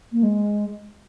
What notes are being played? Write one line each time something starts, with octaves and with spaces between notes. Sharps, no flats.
A#3
G#3